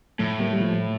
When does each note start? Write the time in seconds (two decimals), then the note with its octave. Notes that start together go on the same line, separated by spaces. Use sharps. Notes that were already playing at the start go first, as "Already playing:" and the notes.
0.19 A2 F3 A3
0.40 G3 A#3
0.53 G3
0.60 F3 A3